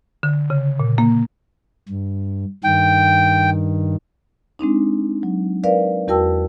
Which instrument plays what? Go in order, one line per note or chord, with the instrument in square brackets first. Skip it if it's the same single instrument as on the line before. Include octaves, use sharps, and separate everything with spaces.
[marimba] D3
C#3
A#2
A#3
[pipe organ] G2
[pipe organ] G2 D#3 [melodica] G5
[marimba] G#3 C4 D4 D#4
F#3
A#4 B4 D5 F5
E2 F#4 A#4 G5 A5 E6